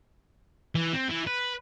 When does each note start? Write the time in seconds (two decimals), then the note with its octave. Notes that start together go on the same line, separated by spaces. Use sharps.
0.75 E3
0.93 C4
1.09 E3
1.27 B4